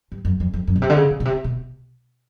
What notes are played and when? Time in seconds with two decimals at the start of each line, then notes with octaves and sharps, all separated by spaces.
0.12 G2
0.25 F#2
0.40 F2
0.54 F2
0.67 F#2
0.76 B2
0.82 C3
0.90 D3
0.96 C#3
1.11 C3
1.20 B2
1.25 C3
1.44 B2